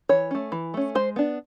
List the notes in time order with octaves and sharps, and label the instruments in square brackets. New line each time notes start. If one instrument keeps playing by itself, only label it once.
[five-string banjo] E3 C#5
A3 C#4
E3
A3 C#4
G#3 C5
B3 D4